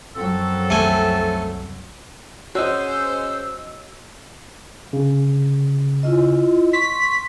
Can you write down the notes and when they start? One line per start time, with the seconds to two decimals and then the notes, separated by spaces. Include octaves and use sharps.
0.15 F#2 F3 F#3 C4 A4
0.70 C2 A3 G#5
2.55 C#4 F#4 G#4 C5 C#5 D#5 E6
4.93 C#3
6.03 E4 F4 D#5
6.73 C6 C#6 B6